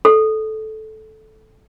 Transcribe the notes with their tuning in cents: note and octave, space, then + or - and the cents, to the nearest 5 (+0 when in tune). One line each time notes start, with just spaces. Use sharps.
A4 -10